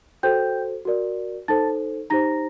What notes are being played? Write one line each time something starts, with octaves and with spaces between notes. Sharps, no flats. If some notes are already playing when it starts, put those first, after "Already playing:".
F#4 A4 C5 G5 G6
F#4 A#4 D5
D#4 A4 C5 A5 A6
D#4 G4 C5 A#5 A#6